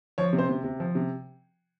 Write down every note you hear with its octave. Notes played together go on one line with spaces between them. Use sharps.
F3 C#5
C3
C5
C3
C3
F3
C3